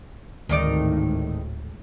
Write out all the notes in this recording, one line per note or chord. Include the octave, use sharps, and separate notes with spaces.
G#1 D2 A2 D#3 D#4 D5